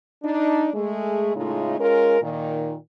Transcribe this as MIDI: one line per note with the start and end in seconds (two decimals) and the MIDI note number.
0.23 0.69 62
0.23 0.69 63
0.73 1.32 56
0.73 1.32 57
0.73 1.32 68
1.35 1.78 45
1.35 1.78 49
1.35 1.78 56
1.35 1.78 57
1.35 1.78 63
1.35 1.78 65
1.79 2.17 56
1.79 2.17 61
1.79 2.17 65
1.79 2.17 70
2.21 2.74 46
2.21 2.74 51